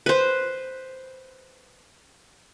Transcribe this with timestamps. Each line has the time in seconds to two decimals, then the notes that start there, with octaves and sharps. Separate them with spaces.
0.06 B4 C5